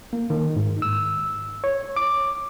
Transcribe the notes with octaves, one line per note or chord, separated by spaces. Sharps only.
A#3
D#3
G#2
E6
C#5
D6